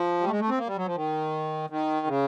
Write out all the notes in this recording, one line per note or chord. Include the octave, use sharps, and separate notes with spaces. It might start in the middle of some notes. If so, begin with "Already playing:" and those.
Already playing: F3
G3
A3
G#3
A3
C4
A#3
G3
F#3
F3
D#3
D#3
C#3